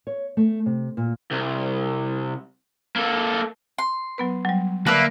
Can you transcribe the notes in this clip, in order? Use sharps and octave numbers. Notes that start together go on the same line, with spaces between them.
C#5
A3
C3
A#2
C2
A#3 A4
C6
F#3 B3 B4
F#3 G3
D3 A#3 B4 E5 A5